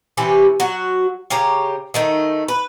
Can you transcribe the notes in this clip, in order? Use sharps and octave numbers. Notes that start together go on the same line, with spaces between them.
C3 E3 C#4 G4
F#3 F#4
C#3 G4 C#5 A#5
D#3 A3 D#4
B4